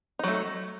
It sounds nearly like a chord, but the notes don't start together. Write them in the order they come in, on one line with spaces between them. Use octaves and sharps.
D#4 F#3 A3